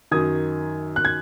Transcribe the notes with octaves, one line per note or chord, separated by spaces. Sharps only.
F#2 D#3 D#6 G#6
F#6
G#6